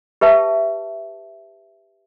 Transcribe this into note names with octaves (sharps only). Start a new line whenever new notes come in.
G4 B4 E5 A5